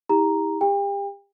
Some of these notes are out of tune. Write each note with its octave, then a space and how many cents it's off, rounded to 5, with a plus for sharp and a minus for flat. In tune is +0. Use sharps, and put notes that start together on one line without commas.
E4 -35 G4 +35 A#5 +0
G4 +35 G5 +35